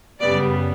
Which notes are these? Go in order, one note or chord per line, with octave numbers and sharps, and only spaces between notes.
F#2 C#3 G3 B3 D5